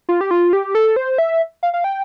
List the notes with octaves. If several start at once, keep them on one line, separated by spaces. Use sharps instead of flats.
F4
G4
F4
G4
A4
C5
E5
F5
F5
G5